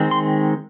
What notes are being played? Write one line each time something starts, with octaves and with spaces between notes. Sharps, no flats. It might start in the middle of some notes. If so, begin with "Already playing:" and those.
Already playing: D#3 G#3 C4
C6